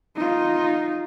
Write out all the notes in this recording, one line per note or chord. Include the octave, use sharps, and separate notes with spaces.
D#4 F4